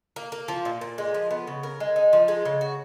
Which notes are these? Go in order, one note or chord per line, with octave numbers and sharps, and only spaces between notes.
A#3
A#3
F3
A#2
A#2
G#3
F3
B3
C#3
A#4
G#3
D#4
F3
G#3
C#3
F#4